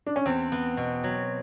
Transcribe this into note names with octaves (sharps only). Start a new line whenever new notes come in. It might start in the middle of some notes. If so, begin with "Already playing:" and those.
D4
C#4
E2 C4
B3
B2
F#3